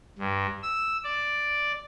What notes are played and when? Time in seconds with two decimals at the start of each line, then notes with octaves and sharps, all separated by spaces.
0.19 G2
0.63 E6
1.04 D5